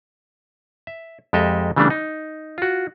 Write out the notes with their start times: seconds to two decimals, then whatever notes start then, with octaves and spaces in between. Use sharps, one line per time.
0.87 E5
1.33 F2 G#3 G4 A4 D#5 E5
1.76 C#3 E3 G3 A3 D4
1.90 D#4
2.58 F4 F#4